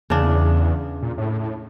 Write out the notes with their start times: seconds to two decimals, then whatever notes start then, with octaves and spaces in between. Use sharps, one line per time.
0.10 E2 C#3 D4
1.02 A#2
1.18 A2